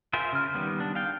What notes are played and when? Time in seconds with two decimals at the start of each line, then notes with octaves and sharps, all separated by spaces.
0.13 F4 G#4 A#4 C5 E5
0.33 C#3 F6
0.55 D#3 G3 B3
0.80 D4
0.95 F5 G5